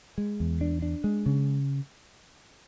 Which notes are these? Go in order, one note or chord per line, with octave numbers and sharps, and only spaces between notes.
G#3
E2
D4
D4
G#3
C#3